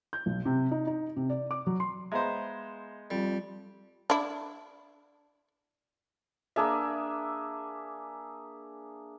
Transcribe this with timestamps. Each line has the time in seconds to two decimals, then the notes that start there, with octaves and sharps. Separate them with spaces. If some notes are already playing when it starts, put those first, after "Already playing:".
0.13 G6
0.26 B1
0.45 C3
0.71 D#4
0.87 D#4
1.16 C3
1.30 D5
1.51 D6
1.67 F#3
1.80 C6
2.12 G#3 B3 C5 E5 F5 A#5
3.11 F2 G3
4.10 D4 E4
6.56 A#3 D4 G#4 E5